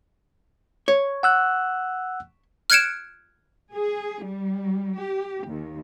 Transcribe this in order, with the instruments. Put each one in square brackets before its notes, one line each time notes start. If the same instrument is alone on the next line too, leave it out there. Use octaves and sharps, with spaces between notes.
[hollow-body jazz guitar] C#5
[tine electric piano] F#5 E6 F#6
[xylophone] F6 F#6 G#6 C#7 D7 E7
[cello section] G#4
G3
G4
D#2